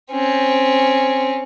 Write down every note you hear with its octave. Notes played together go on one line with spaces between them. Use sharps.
C4 C#4